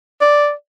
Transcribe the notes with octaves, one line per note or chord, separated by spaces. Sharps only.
D5